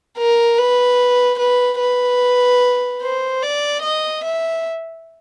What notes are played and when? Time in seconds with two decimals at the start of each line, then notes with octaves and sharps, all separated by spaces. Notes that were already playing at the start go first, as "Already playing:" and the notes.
0.18 A#4
0.58 B4
1.39 B4
1.80 B4
3.02 C5
3.43 D5
3.82 D#5
4.24 E5